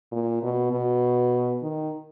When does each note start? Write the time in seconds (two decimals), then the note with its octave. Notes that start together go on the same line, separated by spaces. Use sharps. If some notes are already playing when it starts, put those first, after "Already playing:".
0.12 A#2
0.43 B2
0.72 B2
1.62 D#3